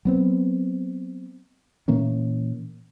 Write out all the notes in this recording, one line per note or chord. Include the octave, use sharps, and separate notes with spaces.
F#3 B3 C4
A#2 E3 A#3 C#4